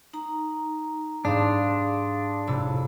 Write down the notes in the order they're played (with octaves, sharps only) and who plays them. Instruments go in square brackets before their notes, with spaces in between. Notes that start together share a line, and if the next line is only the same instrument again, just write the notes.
[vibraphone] D#4 A#5
[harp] G#2 G3 [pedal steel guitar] D4 [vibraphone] F5 C6 D#6
[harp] F1 A2 E6 [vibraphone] A5 B5